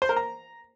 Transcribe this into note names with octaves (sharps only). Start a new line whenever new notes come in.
C5
A#4
A#5